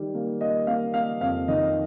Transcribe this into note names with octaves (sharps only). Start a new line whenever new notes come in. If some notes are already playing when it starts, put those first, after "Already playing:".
Already playing: D#3 G3
A#3
A#3 D#5
A#3 F5
A#3 F5
F2 F5
D#3 D#5